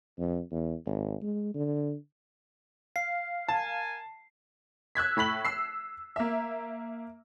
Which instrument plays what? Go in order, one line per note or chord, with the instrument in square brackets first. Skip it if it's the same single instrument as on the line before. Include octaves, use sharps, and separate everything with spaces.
[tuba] F2
E2
G#1
G#3
D3
[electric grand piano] F5 [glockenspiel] C7
[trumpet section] A#4 G#5 [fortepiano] A5
[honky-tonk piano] E6 F#6 G#6 B6
A2 B5 B6 F#7
E6 C7
A#3 E5